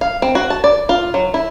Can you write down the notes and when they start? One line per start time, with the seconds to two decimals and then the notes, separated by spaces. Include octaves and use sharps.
0.01 F5
0.22 C4
0.35 F#4
0.50 A5
0.64 D5
0.89 F4
1.14 F#3
1.34 E4